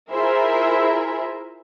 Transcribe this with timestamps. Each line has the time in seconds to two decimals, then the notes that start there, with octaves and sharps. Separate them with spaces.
0.10 E4 F4 G#4 A#4 C5 E5